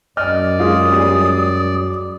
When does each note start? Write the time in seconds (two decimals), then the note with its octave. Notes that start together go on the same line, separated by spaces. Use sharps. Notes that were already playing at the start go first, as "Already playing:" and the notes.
0.17 F#2 D5 D#5 F6
0.59 G#3 F4 D#6
0.92 G3 G#3 G#4